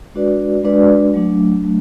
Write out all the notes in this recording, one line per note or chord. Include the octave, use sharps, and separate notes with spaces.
G#3 D4 F#4 B4 D5
G#3 D4 F#4 B4 D5
F#3 A3 D4
F#3 A3 D4